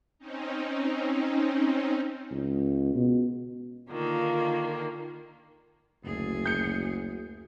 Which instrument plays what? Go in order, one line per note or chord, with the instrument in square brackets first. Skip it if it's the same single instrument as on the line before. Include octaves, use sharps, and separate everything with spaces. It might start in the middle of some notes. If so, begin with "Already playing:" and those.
[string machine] C4 C#4 D#4
[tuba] C#2
B2
[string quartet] D3 D#3 A#3 [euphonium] F4
[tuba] F#1 [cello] D2 G#4
[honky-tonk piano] G6 C#7